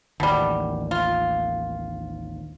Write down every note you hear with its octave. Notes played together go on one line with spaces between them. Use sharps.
A1 D#2 B2 D#3 G3
F4